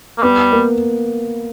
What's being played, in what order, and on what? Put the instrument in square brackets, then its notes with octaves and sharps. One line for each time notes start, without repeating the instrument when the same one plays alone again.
[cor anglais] A#3
[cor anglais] G3 [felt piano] B3
[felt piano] A#3